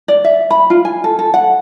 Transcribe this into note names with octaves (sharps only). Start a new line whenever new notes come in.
D5
E5
B5
F4
G#5
A4
A4
F#5